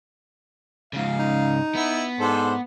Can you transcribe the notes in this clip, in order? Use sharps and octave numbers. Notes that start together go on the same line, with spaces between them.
G#2 C#3 F5
D#4
B3 E4
G#2 D4 A4 C5